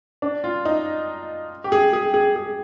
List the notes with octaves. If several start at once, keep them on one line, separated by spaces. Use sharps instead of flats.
D4
F4
D#4
G4
G#4
G#4
G#4
G#4